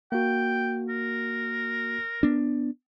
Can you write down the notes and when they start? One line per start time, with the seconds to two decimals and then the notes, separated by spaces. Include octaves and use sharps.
0.12 A#3 F#4 G5
0.89 A#4
2.23 B3 D4